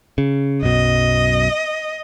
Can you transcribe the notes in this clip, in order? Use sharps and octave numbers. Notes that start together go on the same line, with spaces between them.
C#3
B1 F#2 B2 D#5